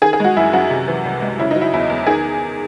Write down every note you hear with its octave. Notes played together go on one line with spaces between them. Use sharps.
D#3 G#4
G#4
G#3 F#4
F#2 E4
F#2 F#4
C3
E3
C2
G#3
C#3 E4
D#4
F#3
E4
E2 E4
E2
D#3 G#4